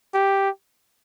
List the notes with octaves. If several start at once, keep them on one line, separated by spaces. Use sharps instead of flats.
G4